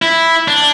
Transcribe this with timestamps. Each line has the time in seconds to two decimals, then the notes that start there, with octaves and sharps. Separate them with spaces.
0.02 E4
0.48 D4